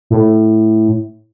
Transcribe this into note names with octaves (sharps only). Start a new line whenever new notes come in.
A2